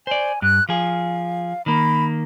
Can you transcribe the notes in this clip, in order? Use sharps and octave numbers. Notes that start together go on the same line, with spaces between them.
C5 D5 G#5
G2 F#6
F3 G#4 F5
D#3 A#3 B5